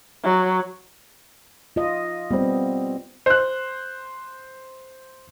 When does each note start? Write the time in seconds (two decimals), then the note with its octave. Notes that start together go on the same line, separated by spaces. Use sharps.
0.24 F#3
1.76 F4 D#5
2.31 G3 B3 C4
3.26 C5 F#6